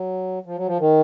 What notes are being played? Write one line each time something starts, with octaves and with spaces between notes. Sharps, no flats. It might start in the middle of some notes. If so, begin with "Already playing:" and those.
Already playing: F#3
F3
F#3
F3
D#3